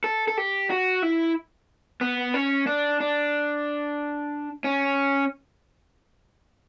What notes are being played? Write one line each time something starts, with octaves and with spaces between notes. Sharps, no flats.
A4
A4
G4
F#4
E4
B3
C#4
D4
D4
C#4